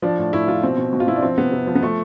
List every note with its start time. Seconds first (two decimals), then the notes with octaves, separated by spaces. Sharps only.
0.02 F3 D4
0.18 A2
0.33 A2 E4
0.48 F3 F4
0.63 B2 C4
0.77 B2
0.93 B2
1.00 F4
1.07 B2 E4
1.16 D4
1.22 F3 C4
1.38 C3 B3
1.52 C3
1.67 F3
1.75 B3
1.83 F3 A3